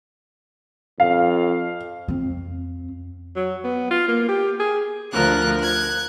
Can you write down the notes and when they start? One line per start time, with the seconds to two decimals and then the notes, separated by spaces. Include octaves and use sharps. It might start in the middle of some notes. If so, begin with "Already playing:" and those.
1.00 F2 F5
2.08 F2 C4
3.36 F#3
3.64 B3
3.91 F4
4.08 A#3
4.28 G4
4.60 G#4
5.12 D2 D3 F3 A#4 F#6
5.60 F#6 G#6